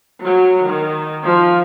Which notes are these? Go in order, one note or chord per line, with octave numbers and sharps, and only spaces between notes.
F#3
D#3
F3